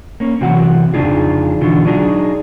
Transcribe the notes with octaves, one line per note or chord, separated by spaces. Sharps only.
A#3 C#4
C3 E3 F#3 F#4 F#5
F2 C#3 D4 D#4 F4 G#4
B2 D3 E3 F4 F#4
F#3 D4 D#4 F#4 G#4